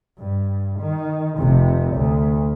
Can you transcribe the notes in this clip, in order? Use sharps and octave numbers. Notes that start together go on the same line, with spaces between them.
G2
D#3
F1 C3
D2